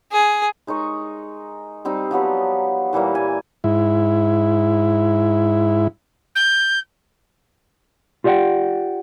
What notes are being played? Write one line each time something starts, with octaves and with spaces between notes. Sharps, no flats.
G#4
G#3 D#4 A#4 C#6
G3 C4 D#4
F3 F#3 B3 G4
A#2 E3 G3 A#3
G#5
G#2 E4
G6
F4 G4 D5 D#5 F#5 G5